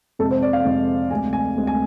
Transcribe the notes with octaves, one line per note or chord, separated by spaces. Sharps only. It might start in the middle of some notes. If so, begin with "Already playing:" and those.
F2 C3 G#3 A4
C5
D5
F5
F2 C3 G#3
D2 C3 G#3 G#5
G#5
D2 C3 G#3
G#5